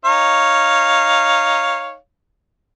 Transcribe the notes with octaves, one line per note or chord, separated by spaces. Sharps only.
D#4 C#5 F5